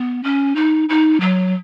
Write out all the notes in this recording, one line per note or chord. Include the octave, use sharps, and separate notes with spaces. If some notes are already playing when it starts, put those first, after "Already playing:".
Already playing: B3
C#4
D#4
D#4
F#3